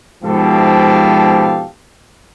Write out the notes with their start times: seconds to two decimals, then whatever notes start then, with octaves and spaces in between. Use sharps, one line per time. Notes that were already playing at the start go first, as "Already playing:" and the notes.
0.23 G#2 B2 F3 G4 A4 F5